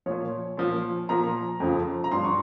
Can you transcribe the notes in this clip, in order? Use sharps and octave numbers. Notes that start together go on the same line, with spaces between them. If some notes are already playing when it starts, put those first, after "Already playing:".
A#2 F3 C#5
A#2 F3
A#2 F3 A#5
F2 C#3 F3
A#5
G2 F3 C6
C#6